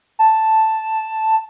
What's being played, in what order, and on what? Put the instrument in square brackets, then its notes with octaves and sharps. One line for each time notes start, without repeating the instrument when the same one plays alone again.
[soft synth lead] A5